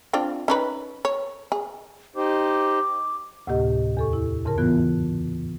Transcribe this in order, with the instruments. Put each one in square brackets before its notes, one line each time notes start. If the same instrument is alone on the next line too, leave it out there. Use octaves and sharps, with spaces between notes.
[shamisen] C4 D4 F4
C#4 D#4 B4
C#5
G#4
[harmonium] D#4 G4 C5 [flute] D6
[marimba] D2 A2 C3 A#3 G4 D#5
E2 A4 C#6
E4
F2 G#2 C#3 A#4 A5
E3 B3 F4 F#6